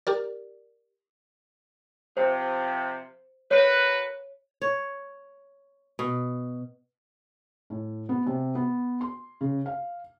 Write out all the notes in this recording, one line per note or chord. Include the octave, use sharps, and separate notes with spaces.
G4 A#4 D5
C3 F3 C5
F#4 A#4 B4 C#5
C#5
B2
A2
B3
C3
B3
C6
C#3
F5